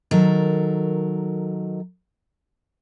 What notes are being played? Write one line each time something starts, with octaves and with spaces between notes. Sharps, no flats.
D#3 F#3 A4 A#4